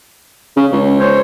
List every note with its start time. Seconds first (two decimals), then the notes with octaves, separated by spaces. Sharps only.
0.57 C#3
0.72 C#2
1.00 C5 C#5